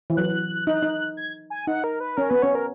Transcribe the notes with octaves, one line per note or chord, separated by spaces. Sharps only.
E3
F#3 F#6
D#4
D#4
G#6
G#5
D#4 F#5
A#4
B4
C#4 A#4
B3 B4
C#4 C#5
A#4